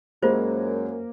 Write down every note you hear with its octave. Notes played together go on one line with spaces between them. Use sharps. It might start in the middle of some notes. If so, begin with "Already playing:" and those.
F#2 G#3 A#3 F4 C5